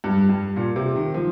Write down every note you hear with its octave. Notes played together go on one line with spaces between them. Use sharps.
G2
G2
A#2
C3
D#3
F3